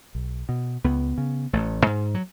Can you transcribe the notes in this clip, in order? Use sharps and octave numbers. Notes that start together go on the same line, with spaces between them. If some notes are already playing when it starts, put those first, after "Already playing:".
B1
B2
C#2 B3
C#3
A1 A3
G#2
F#3